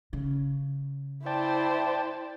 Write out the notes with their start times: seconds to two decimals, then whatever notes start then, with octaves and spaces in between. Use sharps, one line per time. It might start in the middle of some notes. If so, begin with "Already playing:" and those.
0.13 C#3
1.26 E4 C5 D5 G5 A5